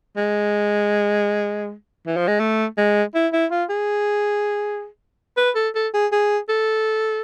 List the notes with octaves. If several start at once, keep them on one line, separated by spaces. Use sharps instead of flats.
G#3
E3
F3
G#3
A3
G#3
E4
E4
F4
G#4
B4
A4
A4
G#4
G#4
A4